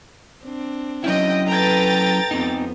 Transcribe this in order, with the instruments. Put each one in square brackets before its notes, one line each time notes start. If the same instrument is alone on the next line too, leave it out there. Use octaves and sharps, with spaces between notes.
[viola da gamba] C4 D4
[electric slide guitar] F#3 C#4 E4 [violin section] D#5 G5
[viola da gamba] A4 B4 [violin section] G5 A#5 A6
[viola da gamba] F2 B3 [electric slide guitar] C4 D#4